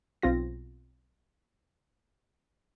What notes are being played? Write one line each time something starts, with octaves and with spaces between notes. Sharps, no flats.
B1 C4 F4 A#6